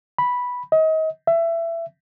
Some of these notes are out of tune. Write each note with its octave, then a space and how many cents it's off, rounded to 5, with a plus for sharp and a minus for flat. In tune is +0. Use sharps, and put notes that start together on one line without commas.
B5 -5
D#5 +30
E5 +20